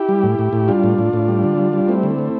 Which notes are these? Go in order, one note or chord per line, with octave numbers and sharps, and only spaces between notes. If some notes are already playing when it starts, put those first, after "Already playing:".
Already playing: E4 G4
G3
A2
A2
A2
G3 D4 F4
A2
A2
A2
G3
D3
G3
G3
A3 C4 E4
D3
A3